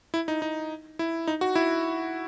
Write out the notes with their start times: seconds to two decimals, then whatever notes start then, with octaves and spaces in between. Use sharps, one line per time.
0.14 E4
0.28 D#4
0.42 D#4
0.99 E4
1.27 D#4
1.41 F#4
1.55 E4